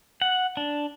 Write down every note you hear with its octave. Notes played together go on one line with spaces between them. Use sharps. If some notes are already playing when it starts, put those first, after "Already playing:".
F#5
D4